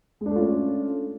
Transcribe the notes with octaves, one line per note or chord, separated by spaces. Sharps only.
G#3 A3 C#4 D4 F4